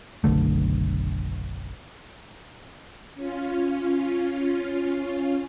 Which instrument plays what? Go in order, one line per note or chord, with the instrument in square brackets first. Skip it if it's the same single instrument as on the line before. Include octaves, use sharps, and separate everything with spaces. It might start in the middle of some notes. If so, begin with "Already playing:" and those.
[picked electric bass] F#1 B1 D3 A3
[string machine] C#4 F4